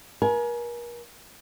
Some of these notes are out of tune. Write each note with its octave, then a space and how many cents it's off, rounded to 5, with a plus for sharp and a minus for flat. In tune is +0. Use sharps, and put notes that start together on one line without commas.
A#4 +40 G#5 +30